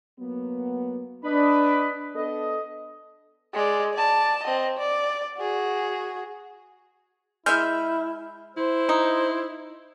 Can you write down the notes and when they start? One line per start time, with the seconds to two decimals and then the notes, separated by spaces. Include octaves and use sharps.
0.19 F#3 A#3 B3
1.24 D4 B4 D#5 B5
2.16 B3 D4 A4 D#5
3.54 G#3 D5
3.94 D5 A5
4.44 C4 D#5
4.78 D5
5.38 F#4 G#4
7.46 G#3 E4 E5 F6 G6
8.57 E4 C5
8.89 D#4